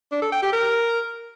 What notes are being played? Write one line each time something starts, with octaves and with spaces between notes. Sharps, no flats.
D4
A4
G5
G4
A#4